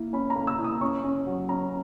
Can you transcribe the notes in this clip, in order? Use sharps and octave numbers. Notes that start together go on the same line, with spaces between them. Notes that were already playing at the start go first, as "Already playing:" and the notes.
Already playing: A#3 E4
C#4 B5
A#5
A#3
E6
E4
D#6
C#4 C#6
C#4
F#3
C#4 A#5